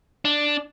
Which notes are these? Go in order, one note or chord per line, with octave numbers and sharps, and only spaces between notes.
D4